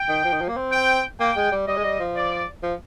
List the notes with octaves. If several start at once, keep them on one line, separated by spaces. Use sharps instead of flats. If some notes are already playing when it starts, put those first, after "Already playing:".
Already playing: G5
D#3
F3
D#3
F3
A#3
C4
G5
A#3 G5
G#3
G3
G3 D#5
G#3
G3
F3
D5
F3